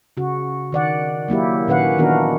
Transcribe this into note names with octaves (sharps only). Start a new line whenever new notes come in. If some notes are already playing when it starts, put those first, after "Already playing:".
C#3 F#4
D#3 D5 F#5
F#3 A#3 E4 G4
A#2 D#3 C#4 B4 F5 F#5
D#3 E3 B3 D4 F#4 A#4